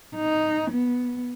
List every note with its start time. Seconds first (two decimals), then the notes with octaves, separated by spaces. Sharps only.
0.15 D#4
0.71 B3